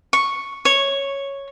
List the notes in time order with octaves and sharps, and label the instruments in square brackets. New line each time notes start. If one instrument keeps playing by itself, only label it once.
[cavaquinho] C#6
C#5